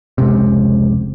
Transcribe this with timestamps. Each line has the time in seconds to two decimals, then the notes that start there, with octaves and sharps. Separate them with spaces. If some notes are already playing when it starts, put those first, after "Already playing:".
0.18 F1 C#2 C3